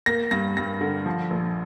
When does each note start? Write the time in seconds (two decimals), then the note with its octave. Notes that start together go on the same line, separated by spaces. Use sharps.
0.06 A#3 A#6
0.31 G2 A#6
0.57 G2 A#6
0.81 D3
1.06 F3
1.31 A#1